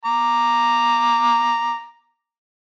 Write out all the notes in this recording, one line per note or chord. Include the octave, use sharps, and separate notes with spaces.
A#5 D6